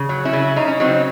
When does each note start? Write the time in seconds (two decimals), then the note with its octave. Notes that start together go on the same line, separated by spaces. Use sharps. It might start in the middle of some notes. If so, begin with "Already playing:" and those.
Already playing: C#3
0.09 F#3
0.25 C#4 E4
0.33 C#3
0.56 C#3 D#4
0.68 C#4
0.80 F#3 C4 D#4